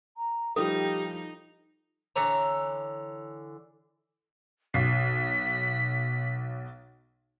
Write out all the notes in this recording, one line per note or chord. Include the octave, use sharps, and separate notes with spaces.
A#5
F3 G3 D#4 G4 A4
D3 E3 C#5 A#5
B1 B6 C7